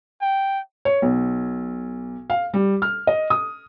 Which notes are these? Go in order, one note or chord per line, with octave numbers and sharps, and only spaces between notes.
G5
C#5
B1
F5
G3
F6
D#5
D#6